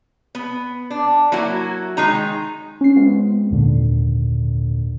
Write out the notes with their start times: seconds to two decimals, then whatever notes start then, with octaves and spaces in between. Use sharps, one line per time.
0.35 B3
0.90 D4
1.32 F#3 A#3 E4 F#4
1.97 D#3 G#3 D#4 A#5
2.81 C#4 C7
2.96 G#3 B3 C4 F4
3.51 G#1 D#2 A#2 D3